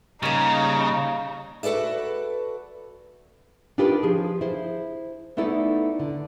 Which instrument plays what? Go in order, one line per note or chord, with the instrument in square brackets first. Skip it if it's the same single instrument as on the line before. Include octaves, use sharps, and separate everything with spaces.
[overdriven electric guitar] C#3 [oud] G3 A#3 [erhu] D#4
[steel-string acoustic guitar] F#4 A4 B4 D5 E5
[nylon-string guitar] D4 D#4 F4 G4 A#4 B4
F3 G#4
E4 C5
A3 B3 D#4 E4 A4 D5
D3